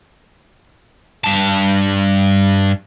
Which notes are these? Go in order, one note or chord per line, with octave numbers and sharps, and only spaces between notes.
G2 A5